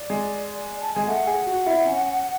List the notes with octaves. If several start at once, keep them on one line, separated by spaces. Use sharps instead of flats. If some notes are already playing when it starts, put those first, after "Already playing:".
Already playing: D5
G#3
A5
G#3 G#5
A3 F#5
G#4
F#4
E4
C#4